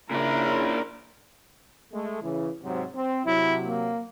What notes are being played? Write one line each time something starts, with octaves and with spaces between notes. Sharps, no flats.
A#2 C#3 D4 E4 A#4
G#3 A3
C#3 E3
G#2 C3 F#3
C4
C3 F#3 E4
A#3